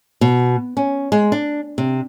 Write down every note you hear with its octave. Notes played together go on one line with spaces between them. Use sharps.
B2
C#4
G#3
D4
C3